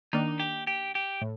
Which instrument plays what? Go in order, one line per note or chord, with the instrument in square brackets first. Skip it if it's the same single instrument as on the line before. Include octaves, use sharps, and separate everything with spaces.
[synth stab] D#3 A#3 D4 [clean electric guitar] D#4
[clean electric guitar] G4
G4
G4
[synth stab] A2